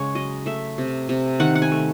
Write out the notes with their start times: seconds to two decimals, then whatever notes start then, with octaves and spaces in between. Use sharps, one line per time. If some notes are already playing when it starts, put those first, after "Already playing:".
Already playing: C#3 G#3 C#5
0.15 F#3 D#5
0.46 A3 E5
0.78 C3
1.09 C3
1.40 D#3 F#5
1.55 F#5
1.62 G#5
1.71 A3